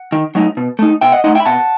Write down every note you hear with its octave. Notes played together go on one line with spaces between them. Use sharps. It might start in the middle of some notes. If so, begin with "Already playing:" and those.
Already playing: F#5
D#3
F#3 A3 D#4
B2
A3 D#4
B2 E5 G5
D#5 F#5
A3 D#4 D#5 F#5
E5 G5
B5
B2 F#5 A5